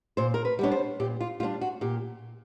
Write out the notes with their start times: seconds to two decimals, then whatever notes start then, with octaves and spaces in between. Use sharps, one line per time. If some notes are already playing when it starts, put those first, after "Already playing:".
0.17 A#2 C5
0.34 A#4
0.45 B4
0.59 G3 B3 D4 C#5
0.72 C5
1.00 A#2 G4
1.21 F4
1.40 G3 F4
1.43 B3 D4
1.61 F#4
1.81 A#2 G4